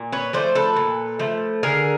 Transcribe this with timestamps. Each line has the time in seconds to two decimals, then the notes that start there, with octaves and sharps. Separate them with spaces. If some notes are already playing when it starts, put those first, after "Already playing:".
Already playing: A#2
0.12 B4 C#5
0.33 F3 A3 C5 D5
0.55 A4 B4
0.76 A#2
1.19 F3 A3
1.63 D3 G#4 A#4